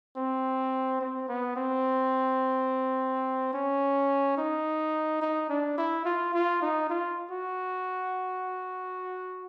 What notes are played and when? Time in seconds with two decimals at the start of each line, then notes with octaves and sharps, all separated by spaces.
0.16 C4
1.01 C4
1.28 B3
1.56 C4
3.53 C#4
4.38 D#4
5.22 D#4
5.49 D4
5.78 E4
6.05 F4
6.34 F4
6.62 D#4
6.90 F4
7.31 F#4